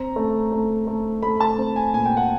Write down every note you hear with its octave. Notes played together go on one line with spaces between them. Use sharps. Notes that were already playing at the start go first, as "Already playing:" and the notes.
Already playing: C4 A#5
A3
A3
A3
A3 B5
A5
C4
G#5
A#2 G#5
G5
F#5